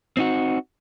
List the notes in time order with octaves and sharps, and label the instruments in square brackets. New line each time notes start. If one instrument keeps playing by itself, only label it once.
[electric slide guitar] C4 D#4 F#4